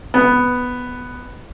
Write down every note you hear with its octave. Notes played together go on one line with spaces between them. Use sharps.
B3